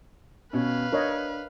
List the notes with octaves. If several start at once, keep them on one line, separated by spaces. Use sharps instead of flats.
B2 C#4 B4 F5
D4 A#4 C#5 D#5